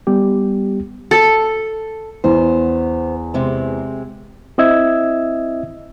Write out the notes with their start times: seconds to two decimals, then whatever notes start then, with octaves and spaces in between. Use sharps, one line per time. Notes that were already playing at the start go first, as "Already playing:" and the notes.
0.07 G3 B3 G4
1.11 A4
2.24 E2 B3 C5
3.34 C3 G#3 C4
4.58 C4 E4 D#5 E5 E6 G#6